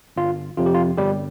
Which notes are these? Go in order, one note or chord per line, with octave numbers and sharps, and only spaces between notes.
G1 F4
F2 C3 F3 F4
G4
F4
G1 G3 G4